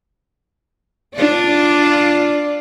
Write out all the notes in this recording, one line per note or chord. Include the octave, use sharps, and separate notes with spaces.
D4 F4 D5